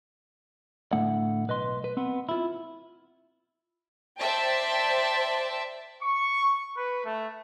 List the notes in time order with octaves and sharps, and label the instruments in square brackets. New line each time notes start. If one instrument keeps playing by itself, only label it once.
[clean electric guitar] A2 D3 A3 F#5
B1 B4 D#5 C6
B4
B3 C4
E4 F4
[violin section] C5 D5 E5 G5 A5
[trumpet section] C#6
B4
A3